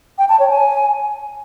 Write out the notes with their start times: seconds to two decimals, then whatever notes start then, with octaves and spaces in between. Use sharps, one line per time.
0.18 G5
0.29 A5
0.40 C#5
0.50 G#5